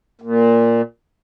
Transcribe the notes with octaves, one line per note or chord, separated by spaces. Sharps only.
A#2